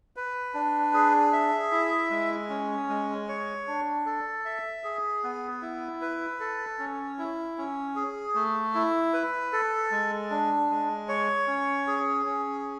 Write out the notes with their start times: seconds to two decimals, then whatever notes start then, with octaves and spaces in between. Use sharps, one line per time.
0.16 B4
0.54 D4
0.94 G#4
1.33 E5
1.71 E4
2.10 G#3
2.49 C#4
2.89 G#3
3.28 C#5
3.67 D4
4.06 A4
4.45 E5
4.84 G#4
5.24 B3
5.62 E4
6.02 B4
6.40 A4
6.79 C#4
7.19 E4
7.58 C#4
7.96 G#4
8.35 A3
8.75 E4
9.13 B4
9.52 A4
9.91 G#3
10.30 D4
10.70 G#3
11.09 C#5
11.47 C#4
11.87 G#4
12.26 C#4